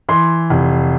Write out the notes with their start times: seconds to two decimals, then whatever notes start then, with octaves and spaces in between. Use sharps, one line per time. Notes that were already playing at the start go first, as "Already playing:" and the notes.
0.09 E3 C6
0.50 F1